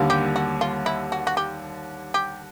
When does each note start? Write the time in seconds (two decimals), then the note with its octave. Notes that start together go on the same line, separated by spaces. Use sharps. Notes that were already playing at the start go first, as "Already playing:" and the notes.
Already playing: D#2 D3 G3 A#3
0.10 G4
0.36 F#4
0.61 F4
0.86 E4
1.12 F#4
1.27 F#4
1.37 G4
2.14 G4